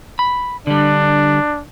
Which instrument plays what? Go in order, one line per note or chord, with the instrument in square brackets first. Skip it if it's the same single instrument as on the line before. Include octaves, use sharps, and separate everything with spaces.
[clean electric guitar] B5
[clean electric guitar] D3 G3 [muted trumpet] D4